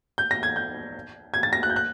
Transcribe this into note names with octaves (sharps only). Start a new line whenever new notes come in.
G6
A#6
G#6
G6
G#6
A6
A#6
F#6
G6
F#6